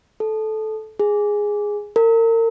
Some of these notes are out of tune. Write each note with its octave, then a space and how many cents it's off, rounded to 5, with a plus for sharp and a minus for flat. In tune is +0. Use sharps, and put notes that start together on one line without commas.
A4 -15
G#4 -5
A#4 -35